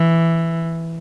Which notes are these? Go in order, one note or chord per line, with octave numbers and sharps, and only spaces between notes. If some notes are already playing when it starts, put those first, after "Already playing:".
Already playing: E3